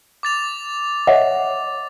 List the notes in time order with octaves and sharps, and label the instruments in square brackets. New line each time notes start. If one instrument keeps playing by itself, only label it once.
[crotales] D6 A6 F7
[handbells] C#5 D#5 [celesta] E5 F#5